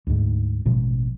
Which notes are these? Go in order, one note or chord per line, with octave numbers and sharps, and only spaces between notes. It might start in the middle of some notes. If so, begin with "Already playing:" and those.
D2 G#2
A1 B2 F3 G#3